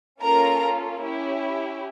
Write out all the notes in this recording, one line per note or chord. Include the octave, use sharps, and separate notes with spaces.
A#3 C#4 F4 A4 A#4 A#5
C#4 E4 G4